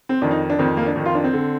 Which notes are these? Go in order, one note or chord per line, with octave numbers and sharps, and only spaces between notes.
C4
F2 D#3 D4
D#4
D4
F2 D#3 C4
A#3
D4
F2 D#3 D#4
F4
D4
C4
D3